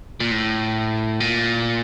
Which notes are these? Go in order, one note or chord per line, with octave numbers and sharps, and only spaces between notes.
A#2
A2
A#2